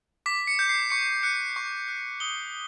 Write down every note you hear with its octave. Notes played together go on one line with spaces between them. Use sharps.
D6 B6
C#7
G6
C7
C#6 C#7
F#6 C#7
C#6
F#6
D#6 G7